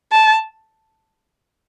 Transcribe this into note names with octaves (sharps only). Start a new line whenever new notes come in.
A5